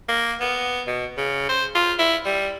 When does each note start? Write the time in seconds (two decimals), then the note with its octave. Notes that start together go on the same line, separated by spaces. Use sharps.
0.08 A#3
0.40 B3
0.87 B2
1.17 C#3
1.49 C5
1.75 F4
1.99 E4
2.25 G3